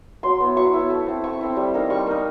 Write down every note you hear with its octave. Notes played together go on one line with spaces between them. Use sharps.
F#3 C6
B3 E4
F#3 C#6
B3 E4
A3
C4 E4
A3 C#6
C4 E4
G3
A#3 D#4
G3 C#6
A#3 D#4